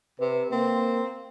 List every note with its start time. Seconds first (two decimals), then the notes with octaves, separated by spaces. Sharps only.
0.20 C3 B4
0.51 A#3 C4